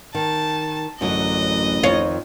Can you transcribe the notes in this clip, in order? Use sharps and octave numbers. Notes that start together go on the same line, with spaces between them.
D#3 A5
A1 F#2 D3 F#3 D#5
F2 D#3 F4 C#5